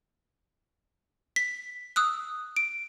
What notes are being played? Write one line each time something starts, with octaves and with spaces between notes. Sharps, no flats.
B6
D#6 E6 F#6
D7